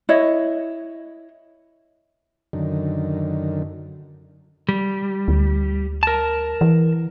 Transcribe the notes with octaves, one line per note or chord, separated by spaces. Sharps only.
E4 C#5 D#5
F#2 D3 D#3
G3
D2
A#4 A5
E3